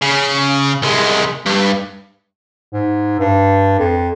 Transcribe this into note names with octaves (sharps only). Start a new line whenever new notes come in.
C#3
C2 G#3
G2
G#2
G2
F2